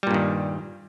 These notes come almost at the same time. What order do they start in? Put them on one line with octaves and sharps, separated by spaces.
G3 A#2 G2 D#3